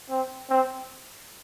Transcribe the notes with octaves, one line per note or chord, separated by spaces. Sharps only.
C4
C4